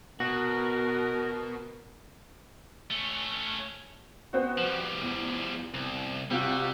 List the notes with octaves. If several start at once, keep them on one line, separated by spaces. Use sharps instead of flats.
B2 B3 F#4 A#4
A3 C#4
B3 C4 F#4
F3 G3
E2
C2
C3 G3 F4 F#4